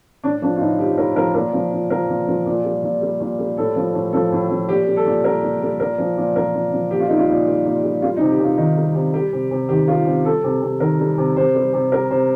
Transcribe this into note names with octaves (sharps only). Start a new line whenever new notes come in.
A2 D4
F3 D4
F4
A2 D#4
F3 G4
A2 A#4
F3 A#4
A#2 A#4
F3
A#2
F3 A#4
A#2
F3
A#2
G3
A#2
G3
A#2
G3
A2 A4
F3
A2
F3 A4
A2
F3
A#2 G4
G3
A4
A#2
G3 A#4
A#2
G3
A#2 A#4
F3
A#2
F3 A#4
A#2
F3
A#2 G4
F4
G3 D#4
F4
A#2
G3
A#2
G3
G3 F4
D#4
C3
G4
C3 F4
D#3 D#4
G3
C3
G3 G4
C3
C3
D#3 G4
G3 F4
C3
G3 A4
C3
C3
D#3 A#4
G3
C3
C3 C5
G3
C3
G3 A#4
C3 C5